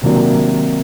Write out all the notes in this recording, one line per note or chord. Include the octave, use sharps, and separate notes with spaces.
C3 D#3 F#3 A#3 D4